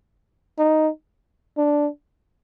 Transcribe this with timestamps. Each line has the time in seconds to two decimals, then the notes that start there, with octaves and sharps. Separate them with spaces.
0.58 D#4
1.57 D4